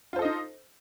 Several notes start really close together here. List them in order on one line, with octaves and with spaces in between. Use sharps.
F4 C5 A4 D#5 D#4